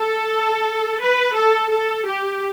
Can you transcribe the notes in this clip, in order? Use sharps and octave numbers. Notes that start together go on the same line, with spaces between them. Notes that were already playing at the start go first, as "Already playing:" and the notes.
Already playing: A4
B4
A4
A4
G4